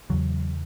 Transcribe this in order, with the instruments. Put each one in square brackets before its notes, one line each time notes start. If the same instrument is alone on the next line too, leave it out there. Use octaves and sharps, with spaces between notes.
[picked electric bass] E2 C#3 F#3